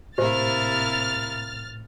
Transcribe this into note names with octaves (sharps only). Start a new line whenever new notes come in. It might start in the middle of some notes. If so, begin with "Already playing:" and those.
A2 C3 A#3 E4 G4 C5 F6 A6